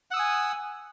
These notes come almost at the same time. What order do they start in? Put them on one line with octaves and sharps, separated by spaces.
F#5 E6 D#6 G#5